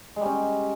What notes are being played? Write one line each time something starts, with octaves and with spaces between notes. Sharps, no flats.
G3 G#3 C#4